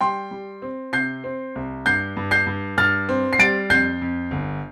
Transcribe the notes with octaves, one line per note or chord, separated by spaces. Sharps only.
G3 G5 C6
G3
C4
C3 G6 C7
C4
C2
G2 G6 C7
G2
G6 C7
G2
G2 F6 A6
C4
C7
G3 A6 D7
F2 G6 C7
F2
G1